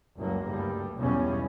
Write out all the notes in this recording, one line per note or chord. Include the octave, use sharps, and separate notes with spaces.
F#1 C#2 G2 F#3 A#3
D2 G2 G3
B1 E2 C#3 G3 C#4